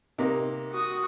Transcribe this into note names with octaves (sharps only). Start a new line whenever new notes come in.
C3 A#3 D#4
F#4 D#6